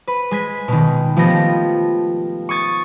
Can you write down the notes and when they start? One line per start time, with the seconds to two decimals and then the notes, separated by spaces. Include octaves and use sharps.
0.07 B4
0.31 G#3 G#6 B6
0.68 B2 D#3
1.17 F3 A3 B3 G4 A#6
2.49 C#6 D#6 G#6 A6